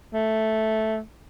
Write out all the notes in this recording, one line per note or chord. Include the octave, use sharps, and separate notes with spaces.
A3